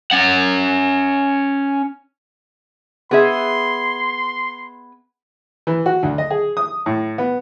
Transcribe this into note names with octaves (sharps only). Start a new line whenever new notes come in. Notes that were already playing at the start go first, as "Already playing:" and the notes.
C#4 F#5
B3 G#4 E5 C6
E3
F#4
D2
D#5
G#4
D#6
A2
B3